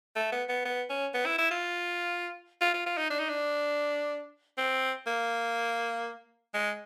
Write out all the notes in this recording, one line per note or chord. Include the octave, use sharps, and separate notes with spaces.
A3
B3
B3
B3
C#4
B3
E4
E4
F4
F4
F4
F4
D#4
D4
D#4
D4
C4
A#3
G#3